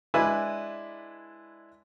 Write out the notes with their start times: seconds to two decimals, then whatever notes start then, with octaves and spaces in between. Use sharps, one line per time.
0.14 G#3 D4 E4 B4 D5 G#5